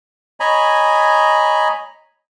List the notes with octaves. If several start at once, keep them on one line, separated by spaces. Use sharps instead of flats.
C#5 D#5 G#5 A#5 B5